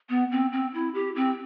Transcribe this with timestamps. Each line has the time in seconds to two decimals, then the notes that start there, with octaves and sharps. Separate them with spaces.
0.10 B3
0.32 C4
0.52 C4
0.74 E4
0.94 G4
1.16 C4